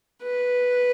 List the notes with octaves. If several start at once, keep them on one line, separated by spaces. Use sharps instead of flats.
B4